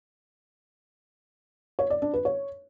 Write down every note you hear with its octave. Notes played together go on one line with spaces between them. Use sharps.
C#5
D5
D4
B4
C#5